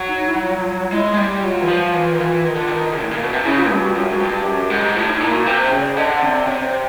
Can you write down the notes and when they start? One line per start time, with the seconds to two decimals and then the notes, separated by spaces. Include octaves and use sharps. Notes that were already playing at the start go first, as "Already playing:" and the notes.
Already playing: F#3
0.08 D#4
0.26 E4
0.42 F4
0.59 F4
0.93 G#3 E4
1.13 G#3
1.17 G3
1.26 G4
1.43 F#3 F4
1.61 E3
1.68 F3
1.93 E3
2.13 D#3
2.19 E3
2.44 D#3
2.55 D3
2.67 D#3
2.99 A2
3.11 A#2
3.22 B2
3.33 C3
3.44 C#3 E4
3.57 F4
3.69 G2 G4
3.82 F#4
3.95 F#2 F4
4.11 G#2 F#4
4.20 G2
4.28 G4
4.45 F#2
4.70 G#2
4.95 A2 F4
5.08 D#4
5.20 A#2 E4
5.33 F#4
5.46 C3 C5
5.62 C5
5.71 C#3
5.80 D5
5.97 D3 D#5
6.22 C3 D5
6.47 C3 C#5
6.64 C5